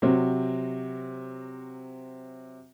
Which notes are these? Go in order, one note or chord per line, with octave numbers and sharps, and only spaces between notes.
C3 F#3 C4